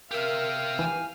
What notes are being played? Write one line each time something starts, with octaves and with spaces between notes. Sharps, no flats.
G4 A#4 E5 F5
E3 G#5